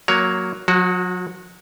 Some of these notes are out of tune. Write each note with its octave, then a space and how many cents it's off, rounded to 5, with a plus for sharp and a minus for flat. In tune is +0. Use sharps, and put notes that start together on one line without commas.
F#3 -5 A#3 +0 C#5 +20
F#3 -40 F#4 +0